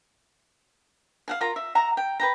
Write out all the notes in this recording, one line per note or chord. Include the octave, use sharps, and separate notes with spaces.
F5 F#5 G#5
F4 A#4 A#5
E5
E5 F#5 A#5
G5
B4 G5 A#5